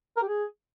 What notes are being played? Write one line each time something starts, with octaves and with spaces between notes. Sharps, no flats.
A#4
G4
G#4